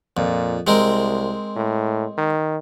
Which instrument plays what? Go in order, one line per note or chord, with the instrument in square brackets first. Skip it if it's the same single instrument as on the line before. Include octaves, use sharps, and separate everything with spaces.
[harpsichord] F2 [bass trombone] A#2
[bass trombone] C2 [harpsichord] G#3 C4 A#4
[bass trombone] A2
D#3